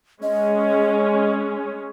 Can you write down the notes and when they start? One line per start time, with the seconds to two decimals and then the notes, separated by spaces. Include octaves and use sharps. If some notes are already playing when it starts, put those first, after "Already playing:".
0.23 G#3 C#4 D#5